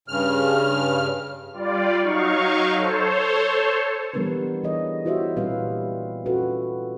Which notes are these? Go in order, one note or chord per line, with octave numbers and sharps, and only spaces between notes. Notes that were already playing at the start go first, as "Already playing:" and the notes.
G2 C#3 F6
G3 F4 D5
F#3 D#4 F5 C#6
A4 C5 C#5
E3 G3 B3 D4 A#4 B4
E3 E4 G#4 C#5 D#5
E4 F#4 G4 C5 C#5 E5
A#2 G3 C4 B4 F5
C#4 F4 F#4 A4 B4